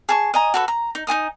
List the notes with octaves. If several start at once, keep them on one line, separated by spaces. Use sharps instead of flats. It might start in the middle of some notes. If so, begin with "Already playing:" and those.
G#4 A5 C#6
D#5 G#5 A#5
F#4 A4 B4
A#5
D#4
D#4 E4 G#5 D#6